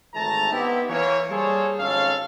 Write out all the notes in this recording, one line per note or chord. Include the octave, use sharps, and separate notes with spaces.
G#1 E3 A3 A5 A#5
B3 C4 D#4 E4 G4
E3 A#3 C#5
G3 A#3 G#4 A4 C5 C#5
G#1 F2 C#4 A4 F5